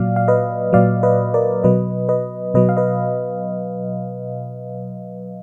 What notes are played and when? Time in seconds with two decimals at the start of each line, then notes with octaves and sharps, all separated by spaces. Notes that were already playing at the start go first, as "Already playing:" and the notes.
Already playing: A#2 F#3 D5 F5
0.16 F5
0.28 B4 D#5
0.73 A#2 F#3 D5 F5
1.03 B4 D#5
1.34 A#4 D5
1.63 B2 F#3 B4 D#5
2.09 B4 D#5
2.54 B2 F#3 B4 D#5
2.69 F5
2.77 B4 D#5